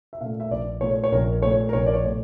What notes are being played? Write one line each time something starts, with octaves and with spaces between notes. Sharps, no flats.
E5
A#2 A3 F5
E5
A#1 D5
A#2 A3 C#5
C#5
A#1 A#4
A#2 A3 C#5
A#4
A#1 C#5
D5
C#5
A#2 A3